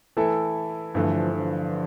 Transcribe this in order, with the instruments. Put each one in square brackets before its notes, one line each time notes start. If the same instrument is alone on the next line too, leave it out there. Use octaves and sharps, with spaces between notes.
[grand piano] E3 A3 E4 A4
[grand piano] G2 E3 A3 [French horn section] D3 F3
[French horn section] D3 F3